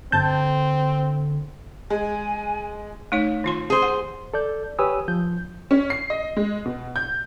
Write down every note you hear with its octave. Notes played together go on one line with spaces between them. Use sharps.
G1 D3 C4 A5 G6
G#3 G#5
A3 D#4 C#5
D#3 F4 C6
G#4 C5
F#5
A4 D5 G6
G4 B4 C#5 G#5 D#6 E6
F3 G6
C#4
C7
D#5
G#3
B2
G6